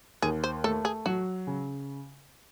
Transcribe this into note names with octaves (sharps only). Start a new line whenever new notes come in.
D#2 G#4
C5
A3 A4
G#4
F#3 F#4
C#3